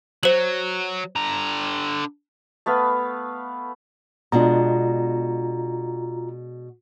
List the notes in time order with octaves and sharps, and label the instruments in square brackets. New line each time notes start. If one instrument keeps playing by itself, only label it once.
[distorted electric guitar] F#3 [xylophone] C5 F#7
[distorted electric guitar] D3 A#5
[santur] A3 B3 B4 F5
[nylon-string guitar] B2 G#3 D4 [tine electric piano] F4 A#5